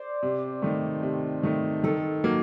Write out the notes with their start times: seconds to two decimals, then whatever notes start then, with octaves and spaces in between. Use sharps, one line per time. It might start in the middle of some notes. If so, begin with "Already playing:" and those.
Already playing: C5 D5
0.23 C3
0.62 D#3 A3
1.03 C3
1.43 D#3 A3
1.84 D#3 A4
2.24 F#3 A#3